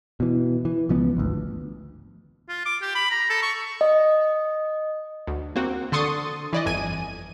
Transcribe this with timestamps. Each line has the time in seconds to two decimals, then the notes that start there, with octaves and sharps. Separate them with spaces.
0.20 B2 E3
0.65 E3
0.89 C#2 F3 B3
1.17 G#1 D2
2.49 F4
2.66 D6
2.82 G4
2.95 B5
3.11 A#5
3.30 A4
3.43 C#6
3.81 D#5
5.27 D2
5.56 A#3 C4 F#4
5.92 D3 A4 C6 C#6 D#6 A6
6.53 E3 D5 D#5
6.66 G1 F2 G#5 D#7